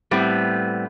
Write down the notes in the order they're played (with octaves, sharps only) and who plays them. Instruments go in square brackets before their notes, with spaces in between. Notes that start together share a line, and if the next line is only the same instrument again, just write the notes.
[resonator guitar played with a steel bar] A2 G3 B3 C4